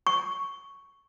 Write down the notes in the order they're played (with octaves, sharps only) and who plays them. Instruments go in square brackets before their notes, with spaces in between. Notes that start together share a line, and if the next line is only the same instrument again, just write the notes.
[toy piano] C#6